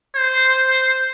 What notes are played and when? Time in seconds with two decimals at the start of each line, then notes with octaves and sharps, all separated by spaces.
0.16 C5